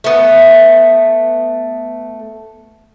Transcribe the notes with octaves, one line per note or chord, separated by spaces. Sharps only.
A3 B3